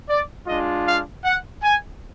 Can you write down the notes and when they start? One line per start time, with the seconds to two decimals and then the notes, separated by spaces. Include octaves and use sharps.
0.08 D5
0.46 G#3 D4 F4 D#5
0.86 F5
1.23 F#5
1.63 G#5